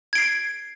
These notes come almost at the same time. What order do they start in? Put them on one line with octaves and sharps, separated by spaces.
G#6 D7 C7